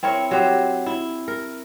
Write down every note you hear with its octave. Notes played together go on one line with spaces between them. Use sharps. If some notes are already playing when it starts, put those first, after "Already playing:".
C4 E4 A#4 C#5
F#3 G4 C5
E4
A#4